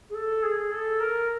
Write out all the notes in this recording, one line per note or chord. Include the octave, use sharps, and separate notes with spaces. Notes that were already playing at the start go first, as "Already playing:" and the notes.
G#4
A4
G#4
A4
A#4